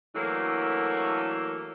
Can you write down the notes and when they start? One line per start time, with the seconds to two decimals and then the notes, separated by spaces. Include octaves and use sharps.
0.15 E3 F#3 A3 A#3 D4